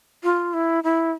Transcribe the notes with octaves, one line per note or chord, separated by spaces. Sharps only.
F4
E4
E4